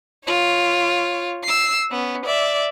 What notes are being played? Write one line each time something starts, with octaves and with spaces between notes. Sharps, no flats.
F4 C#5
E6 C7
B3 C#4
D5 E5